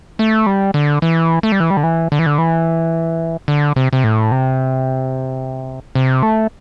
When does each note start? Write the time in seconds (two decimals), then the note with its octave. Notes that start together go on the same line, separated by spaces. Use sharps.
0.19 A3
0.46 G3
0.74 D3
1.02 E3
1.43 A3
1.52 G3
1.60 E3
1.71 G3
1.77 D3
1.83 E3
2.12 D3
2.19 E3
2.26 D3
2.38 E3
3.48 D3
3.76 C3
3.93 C3
4.04 A2
4.32 C3
5.95 C3
6.23 A3